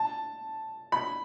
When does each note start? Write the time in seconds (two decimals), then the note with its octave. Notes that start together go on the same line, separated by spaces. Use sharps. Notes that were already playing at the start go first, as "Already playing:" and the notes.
Already playing: A5
0.92 B5